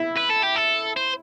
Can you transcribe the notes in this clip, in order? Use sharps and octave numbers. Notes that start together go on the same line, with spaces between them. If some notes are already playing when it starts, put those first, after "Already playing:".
Already playing: E4
B4
A4
G4
A4
C5